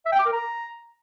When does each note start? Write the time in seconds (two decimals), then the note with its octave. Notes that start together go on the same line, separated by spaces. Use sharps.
0.06 E5
0.12 G5
0.19 D6
0.26 A#4
0.33 A#5